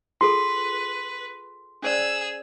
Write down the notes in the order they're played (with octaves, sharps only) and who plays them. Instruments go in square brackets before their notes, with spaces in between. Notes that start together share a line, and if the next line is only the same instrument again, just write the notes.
[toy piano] F4 G#4 A4 [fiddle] B4 [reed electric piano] C6
[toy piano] C#4 C5 D5 [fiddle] G#4 E6